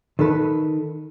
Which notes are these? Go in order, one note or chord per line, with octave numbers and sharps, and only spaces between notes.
D#3 A4 B4